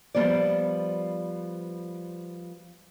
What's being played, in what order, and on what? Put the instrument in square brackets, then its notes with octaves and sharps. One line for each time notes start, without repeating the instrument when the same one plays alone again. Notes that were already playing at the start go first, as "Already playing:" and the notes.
[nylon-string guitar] F3 G3 B3 C5 D5